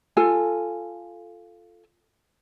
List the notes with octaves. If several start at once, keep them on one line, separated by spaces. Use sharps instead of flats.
F4 A4 G#5